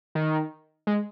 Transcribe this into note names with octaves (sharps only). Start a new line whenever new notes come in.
D#3
G#3